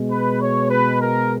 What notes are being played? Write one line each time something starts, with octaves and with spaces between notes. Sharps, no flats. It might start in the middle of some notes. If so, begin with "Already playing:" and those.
Already playing: B2 G#3
B4
C#5
B4
A#4